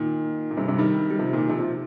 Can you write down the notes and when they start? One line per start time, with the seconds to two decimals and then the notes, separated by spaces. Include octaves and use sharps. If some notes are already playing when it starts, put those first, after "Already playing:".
Already playing: A#2 D#3
0.51 A#2
0.57 G2 C3
0.68 G2 C3
0.78 D#3 G3
1.10 G3
1.19 C3 F3
1.33 A#2 D#3
1.48 C3 F3
1.59 C3 F3